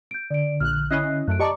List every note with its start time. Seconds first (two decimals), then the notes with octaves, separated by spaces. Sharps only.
0.11 G6 D7
0.31 D3 D5 D7
0.60 A#1 F6 F#6
0.91 C#4 E4 D#5 F#6 C7
1.28 F#2 A3 F#6 D7
1.39 G4 D5 D#5 A5 A#5 C#6 D6